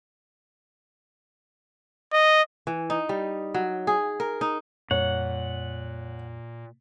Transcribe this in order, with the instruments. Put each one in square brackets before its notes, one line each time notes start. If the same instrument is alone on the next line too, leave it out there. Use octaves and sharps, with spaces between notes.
[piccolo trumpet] D#5
[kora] E3
D#4
G3
F#3
G#4
A#4
D#4
[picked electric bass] F2 G3 [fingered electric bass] A#2 [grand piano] C#5 [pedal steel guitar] F#5